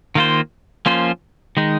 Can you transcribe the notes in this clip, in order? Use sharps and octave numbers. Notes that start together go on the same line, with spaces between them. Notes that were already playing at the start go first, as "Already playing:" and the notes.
D#3 A#3 F4 C5
F3 A#3 C#4 F4 C5
D#3 G#3 D#4